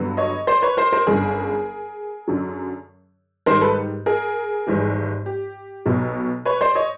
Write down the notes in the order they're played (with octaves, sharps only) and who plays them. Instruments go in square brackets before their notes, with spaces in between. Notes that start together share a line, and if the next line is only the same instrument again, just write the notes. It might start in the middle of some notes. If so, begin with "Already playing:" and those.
Already playing: [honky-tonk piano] G2 D3 F#3 B3
C#5 D#5
C5 D5
B4 C#5
A#4 C5
A#4 C5
G1 F#2 D3 G#4 A#4
F#2 D3 F#3
G#2 D#3 G3 A#4 C5
A4 B4
G#4 A#4
G#1 G#2 E3 G3
G4
B1 B2 F#3
B4 C#5
C5 D5
C#5 D#5